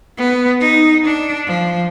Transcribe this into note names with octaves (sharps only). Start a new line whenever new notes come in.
B3
D#4
D4
F3